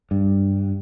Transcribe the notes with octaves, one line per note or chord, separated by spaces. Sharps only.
G2